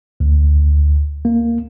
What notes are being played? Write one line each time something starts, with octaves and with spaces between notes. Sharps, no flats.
D2
A#3